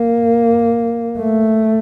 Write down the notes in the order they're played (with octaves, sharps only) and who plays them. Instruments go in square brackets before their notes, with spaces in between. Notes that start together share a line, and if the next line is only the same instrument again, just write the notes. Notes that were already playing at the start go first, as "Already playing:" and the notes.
Already playing: [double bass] A#3
A3